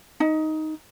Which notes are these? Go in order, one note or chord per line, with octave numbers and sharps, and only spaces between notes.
D#4